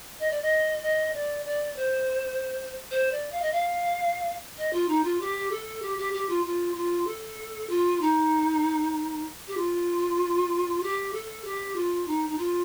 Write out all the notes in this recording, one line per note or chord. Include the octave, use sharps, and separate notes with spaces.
D#5
D5
D#5
D#5
D5
D5
C5
C5
D5
F5
D#5
F5
D#5
F4
D#4
F4
G4
A4
G4
G4
G4
F4
F4
F4
A4
F4
D#4
G4
F4
G4
A4
G4
F4
D#4
D#4
F4